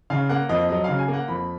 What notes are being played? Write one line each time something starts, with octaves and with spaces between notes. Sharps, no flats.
C#3 F5
A#3 F#5
F2 D#5
F#3 D#5
C#3 F5
G#5
A#3
F#5
F2 B5